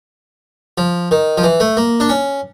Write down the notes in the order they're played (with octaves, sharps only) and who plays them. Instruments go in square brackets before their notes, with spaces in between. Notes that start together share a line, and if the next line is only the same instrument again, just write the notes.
[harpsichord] F3
D#3
F3
E3
A3
A#3
D4
C#4